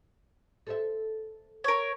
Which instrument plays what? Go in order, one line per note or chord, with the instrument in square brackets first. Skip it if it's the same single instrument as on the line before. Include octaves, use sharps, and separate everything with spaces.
[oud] A4 C5 E5
[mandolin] A#4 C#5